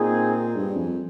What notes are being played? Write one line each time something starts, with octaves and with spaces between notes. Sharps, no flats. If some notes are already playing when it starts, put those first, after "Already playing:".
Already playing: A#2 C4 D#4 G#4
G2
F2